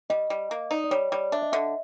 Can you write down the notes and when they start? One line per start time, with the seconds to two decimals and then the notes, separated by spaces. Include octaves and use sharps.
0.10 G3 D#5
0.30 G3
0.51 A#3
0.71 D#4 D5
0.84 D5
0.91 G3 C#5
1.12 G3 D5
1.32 D4 E5
1.42 D#5
1.52 D3 E5